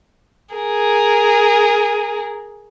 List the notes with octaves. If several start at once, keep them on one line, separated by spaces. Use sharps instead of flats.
G#4 A#4